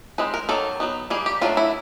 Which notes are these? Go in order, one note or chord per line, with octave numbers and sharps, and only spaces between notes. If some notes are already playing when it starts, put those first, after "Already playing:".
G#3 C4 D#4 B4
A#4
D#3 F#3 A#3 A4
F#3 B3 D#4
G3 A#3 D#4 G#4
G4
D#3 F#3 A3 D4 F4
E4